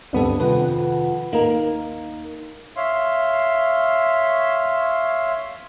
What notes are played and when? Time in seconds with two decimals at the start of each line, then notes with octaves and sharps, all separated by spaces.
0.13 D2 G2 B3 C4 D4 A4
0.40 F2 C3 D#3 B4 F#5
1.33 D#2 A#3 D#4 A#4
2.76 C#5 E5 F5 C6